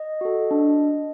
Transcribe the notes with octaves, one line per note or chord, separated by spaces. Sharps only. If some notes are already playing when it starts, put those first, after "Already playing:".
Already playing: D#5
F#4 A4
D4